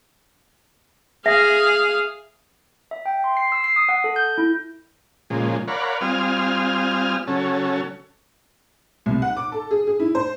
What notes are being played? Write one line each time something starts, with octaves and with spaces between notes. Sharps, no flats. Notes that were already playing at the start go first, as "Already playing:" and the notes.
G#4 E5 F5
E5
G5
C6
C7
E6
C7
D#6
F#5
A4
G6
E4
A#2 C#3 F3 G#3
A#4 C#5 D5 F5 F#5 B5
G3 C4 F4 G#5 D#6 F6
C#3 F#3 C#4 A4
C2
F#5
D6
A4
G#4
G#4
E4
C5